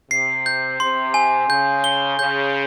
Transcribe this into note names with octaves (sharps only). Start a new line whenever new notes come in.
C3 C7
G6
C3 C6
G#5
C#3 G6
G7
C#3 G6